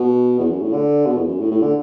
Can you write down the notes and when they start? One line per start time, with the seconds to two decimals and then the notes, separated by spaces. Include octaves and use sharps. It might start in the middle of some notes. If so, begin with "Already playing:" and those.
Already playing: B2
0.39 E2
0.50 F#2
0.62 A2
0.73 D3
1.06 B2
1.17 E2
1.28 F#2
1.40 A2
1.51 A2
1.62 D3